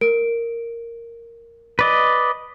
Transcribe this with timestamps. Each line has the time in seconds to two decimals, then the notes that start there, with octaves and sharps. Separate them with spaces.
0.01 A#4 D7
1.79 B4 D5 D#5